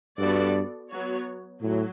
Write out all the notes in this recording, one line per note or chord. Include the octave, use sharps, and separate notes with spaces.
G2 B3 F#4 A4 D5
F#3 B3 F#4 C#5
A2 F#3